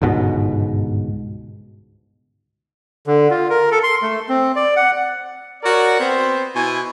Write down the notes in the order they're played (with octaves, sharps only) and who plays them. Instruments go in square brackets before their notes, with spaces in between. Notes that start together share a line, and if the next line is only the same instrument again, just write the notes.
[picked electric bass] G1 C#2 G#2 B2
[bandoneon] D3
F4
A#4
A4
C6
A3
C4
D5
F#5
[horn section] F#4 A#4 C#5 D5
B3 C4 C5
B2 E4 G#5